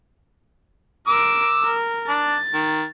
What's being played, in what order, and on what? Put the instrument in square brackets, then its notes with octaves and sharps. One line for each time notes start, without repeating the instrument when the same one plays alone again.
[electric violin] A#4 D7 [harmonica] D6 E6
[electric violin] A#4
[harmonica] D4 [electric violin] A6
[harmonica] D#3